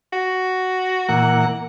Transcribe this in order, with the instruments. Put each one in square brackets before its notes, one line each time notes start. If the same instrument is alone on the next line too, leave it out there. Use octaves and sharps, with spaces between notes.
[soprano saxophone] F#4
[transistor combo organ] A#2 E3 A#3 [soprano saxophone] F#5